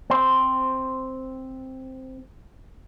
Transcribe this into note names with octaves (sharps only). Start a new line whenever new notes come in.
C4 C5